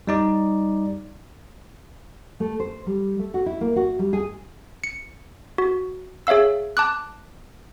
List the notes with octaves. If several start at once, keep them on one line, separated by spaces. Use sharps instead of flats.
G3 D#4 D5
A3
C5
G3
A3
F#4
E4
A#3
F#4
G3
G#4
C#7
F#4
G#4 C#5 E5 F5 E6
A5 D6 F#6